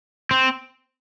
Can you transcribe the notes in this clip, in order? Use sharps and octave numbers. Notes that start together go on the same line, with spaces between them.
C4